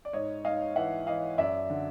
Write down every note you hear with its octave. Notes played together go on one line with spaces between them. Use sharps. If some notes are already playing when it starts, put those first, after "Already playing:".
D5
G#2 C#5 D#5
G#2 D#5 F5
E3 E5 F#5
E3 D#5 F5
F#2 D5 E5
D3